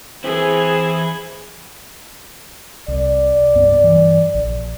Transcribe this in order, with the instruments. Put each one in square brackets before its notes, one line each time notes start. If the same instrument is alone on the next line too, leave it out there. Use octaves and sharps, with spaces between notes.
[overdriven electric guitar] E3 E4 [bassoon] C4 [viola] G#4
[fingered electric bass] C2 [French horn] D5
[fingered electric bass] C2 G2 B3
G2 E3
A#1